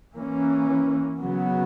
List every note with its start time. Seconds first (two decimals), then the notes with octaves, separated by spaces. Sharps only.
0.16 E3 A#3 C#4
1.22 C#3 F#3 B3